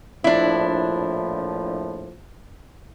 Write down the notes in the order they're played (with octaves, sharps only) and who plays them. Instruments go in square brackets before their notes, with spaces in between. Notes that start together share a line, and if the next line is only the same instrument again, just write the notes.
[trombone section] A#1 A2 F3 [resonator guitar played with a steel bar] D4 E4